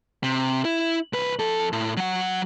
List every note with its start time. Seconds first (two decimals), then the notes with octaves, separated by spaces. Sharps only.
0.23 C3
0.65 E4
1.13 C2 B4
1.39 F2 A4
1.72 A2
1.97 F#3 F#5